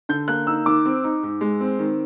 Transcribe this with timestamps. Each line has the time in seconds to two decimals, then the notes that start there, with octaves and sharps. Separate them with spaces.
0.09 D3 G6
0.28 A#3 F#6
0.47 D#4 E6
0.66 D#3 D6
0.86 C4
1.04 D#4
1.23 G#2
1.41 G#3
1.61 C4
1.79 D#3